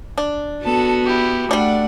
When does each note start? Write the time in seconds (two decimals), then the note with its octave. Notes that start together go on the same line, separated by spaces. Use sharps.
0.18 D4
0.64 B3 F#4 A4 A5
1.05 E4 G4
1.51 G3 A3 D4 D5 F#5